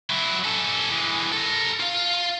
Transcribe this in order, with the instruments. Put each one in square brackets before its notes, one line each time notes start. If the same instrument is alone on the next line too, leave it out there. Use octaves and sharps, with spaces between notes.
[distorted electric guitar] F#3 E4
C#4 A4
E3 G#3
A4 A#4
F4 F5